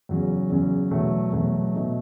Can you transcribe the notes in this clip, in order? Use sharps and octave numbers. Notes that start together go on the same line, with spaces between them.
E2 C#3 F#3 C#4
E2 C#3 F#3 C#4
E2 B2 F#3 A3
E2 B2 F#3 A3
B2 A3 D#4